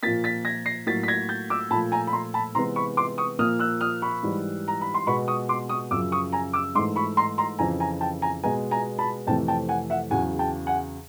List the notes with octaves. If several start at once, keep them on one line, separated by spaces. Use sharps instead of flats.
A#2 F3 A#3 A6 B6
A6 B6
G#6 A#6
A#6 C7
A2 F#3 A#3 A6 B6
B6
G#6 A#6
G6 A6
D6 E6
A#2 F3 A3 A5 B5
G#5 A#5
B5
A#5 C6
A5 B5
C3 E3 G#3 B3 A#5 C6
B5 C#6
C6 D6
C#6 D#6
A#2 F3 A#3 D#6 F6
E6 F#6
D#6 F6
B5 C#6
G#2 E3 G3
A#5
B5
C6
B2 G#3 B3 B5 C#6
C#6 D#6
C6 D6
C#6 D#6
F#2 C#3 F3 D6 E6
C#6 D#6
G#5 A#5
D6 E6
G#2 E3 A3 C6 D6
B5 C#6
A#5 C6
A#5 C6
F2 C#3 E3 G#5 A#5
G#5 A#5
G5 A5
G#5 A#5
B2 G#3 B3 G#5 A#5
G#5 A#5
A5 B5
F2 C3 E3 A3 G5 A5
G5 A5
F#5 G#5
E5 F#5
E2 C#3 F#3 F#5 G#5
G5 A5
F#5 G#5